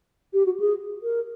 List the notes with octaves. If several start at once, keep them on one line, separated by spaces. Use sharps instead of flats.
G4
F#4
G#4
A#4